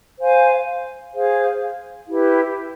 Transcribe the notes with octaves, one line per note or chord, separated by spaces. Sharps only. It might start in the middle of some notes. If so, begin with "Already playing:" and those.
C5 F5 G#5
G#4 C5 F5
E4 G4 B4